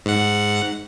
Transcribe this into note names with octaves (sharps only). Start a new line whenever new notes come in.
G#2 F#5